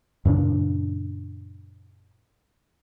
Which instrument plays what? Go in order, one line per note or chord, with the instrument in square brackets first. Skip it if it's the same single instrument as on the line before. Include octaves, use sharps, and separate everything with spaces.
[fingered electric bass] F#2 A#2 C#3 D4